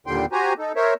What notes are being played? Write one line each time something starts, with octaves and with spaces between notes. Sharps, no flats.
D#2 A#2 D3 G3 G5 C6
F#4 G4 C5 G#5 A#5
D#4 A4
A#4 C5 C#5 E5